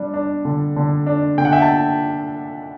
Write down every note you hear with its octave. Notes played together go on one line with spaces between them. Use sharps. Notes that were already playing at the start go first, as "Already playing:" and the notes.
Already playing: G3 D4
D4
D3
D3
D4
D3 G5
F#5
E5 G5
A5